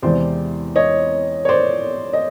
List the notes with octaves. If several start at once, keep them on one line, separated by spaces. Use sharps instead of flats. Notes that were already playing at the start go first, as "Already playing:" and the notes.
E2 C3 E3 G#3 C4 C5 D5
C#5 D#5
C#5
C5 D5
D#5